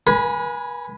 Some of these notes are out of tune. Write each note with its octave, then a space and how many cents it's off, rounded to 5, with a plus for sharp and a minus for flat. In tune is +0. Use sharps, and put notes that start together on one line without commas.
B4 -40 G#5 +0 B5 +10